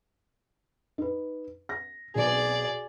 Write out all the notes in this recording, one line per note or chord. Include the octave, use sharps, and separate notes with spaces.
D#4 B4
A#6
B1 G#4 D5